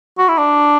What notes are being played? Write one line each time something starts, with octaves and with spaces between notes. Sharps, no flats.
F#4
E4
D4